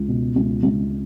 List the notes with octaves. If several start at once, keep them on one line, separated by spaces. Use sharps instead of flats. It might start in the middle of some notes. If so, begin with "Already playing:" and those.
Already playing: C#2
B2
C#2
C#2